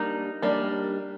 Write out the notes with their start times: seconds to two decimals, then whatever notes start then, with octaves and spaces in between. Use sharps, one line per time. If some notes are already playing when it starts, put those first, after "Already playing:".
Already playing: G3 A#3 D4 D#4
0.42 G3 A#3 D4